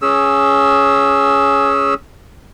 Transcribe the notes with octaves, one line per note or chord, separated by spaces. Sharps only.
C#4 G#4 E6